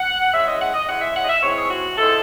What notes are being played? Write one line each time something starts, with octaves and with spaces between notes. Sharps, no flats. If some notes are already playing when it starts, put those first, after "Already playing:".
Already playing: F#5
C#3 E3 G#3 C#4 E5
D#5
F#5
D#5
C#3 E3 G#3 C#4 F#5
E5
F#5
D#5
E5
G#2 E3 G#3 C4 C#5
G#4
F#4
G#2 E3 G#3 C4 A4